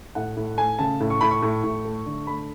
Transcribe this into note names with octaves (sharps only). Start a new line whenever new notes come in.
A2 F#5
A2
A3 G#5
C#3 A5
A2
C#6
A2 B5
C#6
A2
A2
A3
D3
A3 B5